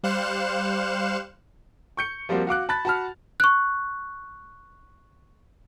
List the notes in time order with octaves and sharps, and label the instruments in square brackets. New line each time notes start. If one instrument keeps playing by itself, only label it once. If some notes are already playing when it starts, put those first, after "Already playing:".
[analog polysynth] G3 C5 F5 F#6 C#7 E7
[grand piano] C#6 G6 C#7
F3 G3 A#3 C4 F#4
F#4 F5 D6 F#6
A5 B5 F#6 A6
F#4 F#5 A5 B5 F6
[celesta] C#6 F#6